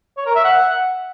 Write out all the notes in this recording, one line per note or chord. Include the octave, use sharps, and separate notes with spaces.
C#5
A#4
E5
F#5